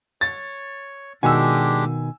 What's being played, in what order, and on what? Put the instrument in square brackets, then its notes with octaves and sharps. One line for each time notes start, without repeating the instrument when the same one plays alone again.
[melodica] C#5 [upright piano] A6
[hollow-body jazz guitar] B2 D#3 F#4 [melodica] G#3 D4 G4 [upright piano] G#5 E6